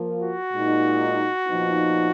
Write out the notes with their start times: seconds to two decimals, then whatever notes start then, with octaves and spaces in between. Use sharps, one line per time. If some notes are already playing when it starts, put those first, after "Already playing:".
Already playing: F3 A#3 F4 A#4
0.22 F#4
0.53 A#2 G#3 D#4
1.47 A#2 F3 B3 D#4